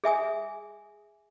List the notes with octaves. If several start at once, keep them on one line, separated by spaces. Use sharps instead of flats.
G#4 E5 G#5 D#6